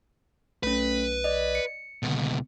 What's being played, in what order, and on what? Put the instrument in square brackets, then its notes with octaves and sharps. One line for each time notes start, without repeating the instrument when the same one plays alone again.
[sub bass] B1 [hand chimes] A3 C#4 [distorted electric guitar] B4
[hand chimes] D5 D#5
C#7
[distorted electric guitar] C#2 B2 [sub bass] D3